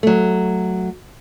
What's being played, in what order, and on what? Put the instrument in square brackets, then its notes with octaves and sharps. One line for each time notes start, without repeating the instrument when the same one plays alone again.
[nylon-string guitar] F#3 A3